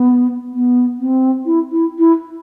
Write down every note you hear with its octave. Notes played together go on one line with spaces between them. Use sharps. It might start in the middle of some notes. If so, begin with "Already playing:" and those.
Already playing: B3
B3
C4
E4
E4
E4